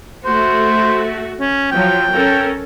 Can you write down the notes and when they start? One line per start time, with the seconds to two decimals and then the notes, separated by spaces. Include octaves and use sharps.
0.25 A3 F#4 C5
1.40 C#4
1.71 F3 F#3 G5
2.11 C#4 A4 A#4